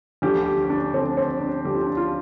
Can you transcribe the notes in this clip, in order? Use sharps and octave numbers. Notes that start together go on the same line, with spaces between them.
D2 D3 F3 G4
G4
D4
D2 D3 F3 C4
C4
D4
D2 D3 F3 G4
F4
D4
F4